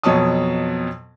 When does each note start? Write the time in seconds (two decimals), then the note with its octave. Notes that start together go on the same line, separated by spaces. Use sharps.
0.03 F2 B2 F#3 C#5 A5 D#6